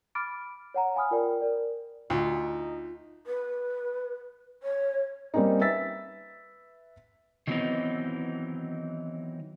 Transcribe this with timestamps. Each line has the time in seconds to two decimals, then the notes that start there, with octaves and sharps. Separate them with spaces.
0.15 B5 D6 F6 A6 D7
0.74 C#5 F#5 A#5
0.95 F5 G#5 B5 D#6 F6
1.11 F4 A#4 D5 G5
1.41 A#4 D5
2.10 D2 D#4 F4
3.27 B4
4.63 C#5
5.34 G3 A#3 C4 C#4 D#4
5.61 B4 E5 E6 A6 B6
7.47 D#3 E3 F#3 B3 C4 D#4